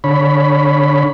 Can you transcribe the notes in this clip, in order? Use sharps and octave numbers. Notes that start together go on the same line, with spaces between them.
D3 C#5 B5